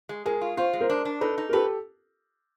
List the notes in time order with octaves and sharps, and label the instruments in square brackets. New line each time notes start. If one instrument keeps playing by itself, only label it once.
[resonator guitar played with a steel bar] G#3
[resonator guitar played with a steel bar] G#3 [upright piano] G#4 A#4
[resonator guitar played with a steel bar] F4
[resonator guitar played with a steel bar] F4 [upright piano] C5
[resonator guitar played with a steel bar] G#3
[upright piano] A#4 C5
[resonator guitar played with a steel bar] D4
D4
[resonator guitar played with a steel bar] D#4 [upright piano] A4 B4
[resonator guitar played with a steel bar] D#4
[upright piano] A#4
[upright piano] G4 A4 [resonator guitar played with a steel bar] B4